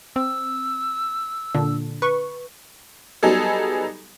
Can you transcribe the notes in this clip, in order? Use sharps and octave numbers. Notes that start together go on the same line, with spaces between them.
C4 E6
A#2 D3 D4
B4 C#6
F#3 G3 B3 D#4 G#4 A4